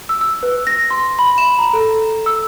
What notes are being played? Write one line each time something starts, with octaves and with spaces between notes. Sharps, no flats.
E6
E6
B4
A#6
C6
B5
E7
A#5
A4
E6